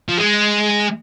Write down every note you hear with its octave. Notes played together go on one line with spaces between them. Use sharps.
F3
G#3